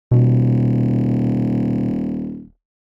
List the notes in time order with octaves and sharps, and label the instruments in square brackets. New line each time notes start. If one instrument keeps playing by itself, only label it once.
[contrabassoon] D#1 [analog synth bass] B2